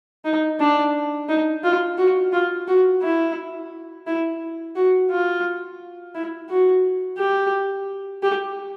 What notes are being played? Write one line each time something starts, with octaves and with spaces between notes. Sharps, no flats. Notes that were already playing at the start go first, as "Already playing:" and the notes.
D#4
D4
D#4
F4
F#4
F4
F#4
E4
E4
F#4
F4
E4
F#4
G4
G4